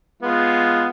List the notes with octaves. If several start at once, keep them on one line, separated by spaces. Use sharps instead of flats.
G#3 B3 F4